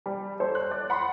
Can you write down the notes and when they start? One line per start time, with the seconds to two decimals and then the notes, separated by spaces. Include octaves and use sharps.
0.06 G3
0.40 A4 C5 C#5
0.55 F#6
0.71 D5
0.90 F#5 B5 C6